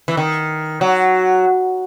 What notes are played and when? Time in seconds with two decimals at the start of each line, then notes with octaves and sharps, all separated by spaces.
0.08 E3
0.17 D#3
0.81 F#3